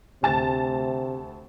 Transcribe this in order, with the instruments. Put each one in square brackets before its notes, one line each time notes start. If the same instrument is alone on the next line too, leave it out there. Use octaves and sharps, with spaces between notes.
[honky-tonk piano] D2 A5 A6 [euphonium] C3